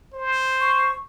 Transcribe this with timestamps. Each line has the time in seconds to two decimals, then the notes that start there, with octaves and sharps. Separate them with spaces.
0.13 C5
0.61 C#6